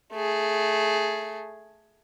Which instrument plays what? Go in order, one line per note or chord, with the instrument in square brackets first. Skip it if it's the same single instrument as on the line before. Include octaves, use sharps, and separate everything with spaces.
[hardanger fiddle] A3 G#4